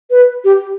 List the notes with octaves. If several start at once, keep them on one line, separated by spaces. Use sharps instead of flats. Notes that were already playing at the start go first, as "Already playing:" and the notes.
B4
G4